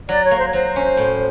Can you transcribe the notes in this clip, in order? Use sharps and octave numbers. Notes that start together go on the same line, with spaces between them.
F#3 D5
C#5
A#3
C5
C#5
F#3 C5
C#4
A2